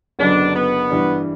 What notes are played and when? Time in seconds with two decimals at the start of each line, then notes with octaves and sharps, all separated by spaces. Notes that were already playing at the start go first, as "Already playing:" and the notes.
0.19 F#1 F#2 D3 F#3 B3 D4
0.55 B3
0.90 G2 E3 G3 D4